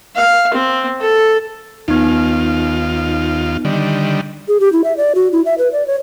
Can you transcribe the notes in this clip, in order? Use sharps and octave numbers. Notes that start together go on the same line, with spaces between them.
F5
C4
A4
D#2 B3 D#4 F4
D3 D#3 G3
G#4
G4
E4
E5
D5
F#4
E4
E5
B4
D5
C#5